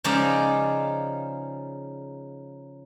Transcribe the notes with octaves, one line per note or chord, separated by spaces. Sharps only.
C#3 F3 G#3 D#4 D5